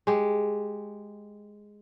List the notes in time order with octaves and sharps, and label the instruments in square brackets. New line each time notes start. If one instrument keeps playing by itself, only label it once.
[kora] G#3 G4